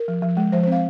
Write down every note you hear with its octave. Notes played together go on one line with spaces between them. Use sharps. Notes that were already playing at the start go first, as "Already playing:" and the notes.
Already playing: A#4
F3
F3
G#3
F3 C5
C4 C5
F5